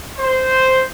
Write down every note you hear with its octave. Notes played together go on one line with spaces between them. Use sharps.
C5